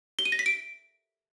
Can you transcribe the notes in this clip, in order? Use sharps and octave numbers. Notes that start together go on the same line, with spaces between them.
G7
D#7
A#6
B6
D7